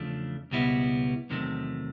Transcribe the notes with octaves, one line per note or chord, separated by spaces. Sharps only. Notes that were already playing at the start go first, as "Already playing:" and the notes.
Already playing: E2 C#3 F3 A3 D4
C#2 B2 G3 B3 E4
E2 C3 D#3 F#3 A3